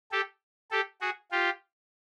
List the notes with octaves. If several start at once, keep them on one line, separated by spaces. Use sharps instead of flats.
G4 A4
G4 A4
F#4 G#4
F4 G4